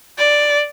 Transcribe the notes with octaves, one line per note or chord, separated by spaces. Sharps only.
D5